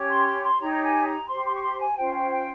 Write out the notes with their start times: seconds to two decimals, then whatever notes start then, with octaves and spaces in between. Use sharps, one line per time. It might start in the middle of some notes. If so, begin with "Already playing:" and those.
Already playing: C#4 G4 C#5
0.09 C6
0.26 C6
0.43 C6
0.59 D#4 G4 C#5 A#5
0.71 A#5
0.83 G#5
1.05 A#5
1.28 G4 C5 C6
1.45 C6
1.54 C#6
1.63 C6
1.79 G#5
1.96 C#4 F4 C5 G5
2.13 G5
2.31 G5